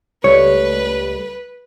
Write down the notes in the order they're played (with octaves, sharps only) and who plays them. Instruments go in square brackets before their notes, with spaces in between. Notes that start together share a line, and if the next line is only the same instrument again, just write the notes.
[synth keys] C#2 G3 A3 [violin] B4 [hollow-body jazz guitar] C#5